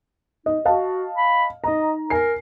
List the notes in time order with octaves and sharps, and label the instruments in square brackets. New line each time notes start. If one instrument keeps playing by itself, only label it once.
[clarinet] D#4 [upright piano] D#5
[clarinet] F#4 [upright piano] D#5 F5 A5
[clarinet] B5
[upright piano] D#4 A#5 [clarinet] D#5
[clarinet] A#4 [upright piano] G#5 C7